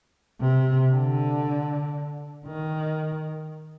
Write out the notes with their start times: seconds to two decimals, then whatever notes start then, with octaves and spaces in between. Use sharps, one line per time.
0.41 C3
0.92 D3
2.46 D#3